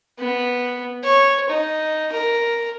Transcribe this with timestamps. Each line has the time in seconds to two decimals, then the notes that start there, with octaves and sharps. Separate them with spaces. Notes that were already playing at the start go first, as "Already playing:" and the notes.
0.19 B3
1.04 C#5
1.49 D#4
2.12 A#4